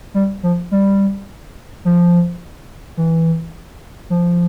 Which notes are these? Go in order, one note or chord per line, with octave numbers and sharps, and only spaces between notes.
G3
F3
G3
F3
E3
F3